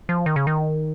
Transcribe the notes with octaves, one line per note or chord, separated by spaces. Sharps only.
F3
D#3
C#3
D#3